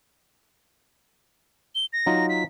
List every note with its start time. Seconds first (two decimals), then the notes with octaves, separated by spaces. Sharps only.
1.75 G7
1.93 A#6
2.06 F#3 D#4 F4
2.29 B6